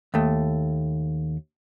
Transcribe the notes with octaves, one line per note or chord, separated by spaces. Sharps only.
D#2 A3